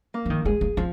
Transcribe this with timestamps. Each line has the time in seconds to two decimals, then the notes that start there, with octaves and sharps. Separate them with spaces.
0.14 A#3
0.26 F3
0.30 D#3
0.45 G#3 G#4
0.61 A#3
0.77 F3 C4